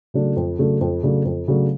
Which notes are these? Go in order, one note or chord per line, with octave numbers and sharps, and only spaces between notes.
C#3 F#3 A3 D4
F2
C#3 F#3 A3 D4
F2
C#3 F#3 A3 D4
F2
C#3 F#3 A3 D4